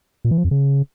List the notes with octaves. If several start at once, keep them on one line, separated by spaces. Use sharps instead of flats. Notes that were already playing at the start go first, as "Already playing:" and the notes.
A#2
E3
F3
F2
C#3